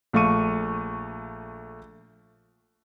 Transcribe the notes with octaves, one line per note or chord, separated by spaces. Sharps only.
A#1 A3 F5 C#6 D#7